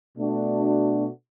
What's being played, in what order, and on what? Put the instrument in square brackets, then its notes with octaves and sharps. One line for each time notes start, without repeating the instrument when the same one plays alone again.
[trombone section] B2 A3 D4 F#4